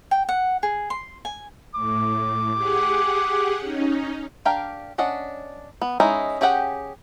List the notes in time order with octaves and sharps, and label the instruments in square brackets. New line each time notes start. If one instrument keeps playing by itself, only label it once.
[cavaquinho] G5
F#5
G#4
C6
G#5
[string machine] A2 [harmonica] D6
[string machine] G4 G#4 F#5
C#4 D#4
[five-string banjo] D4 G4 A#4 F5 G5
C#4 D4 D#5 F#5
B3
G#3 C#4 D#4 E4
C#4 G4 G#4 F#5 G5